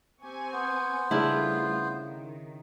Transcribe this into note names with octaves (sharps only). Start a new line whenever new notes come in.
C4 G4 G#5 C#6
B3 C5
C#3 G3 A3 D4 E4 F4
D#3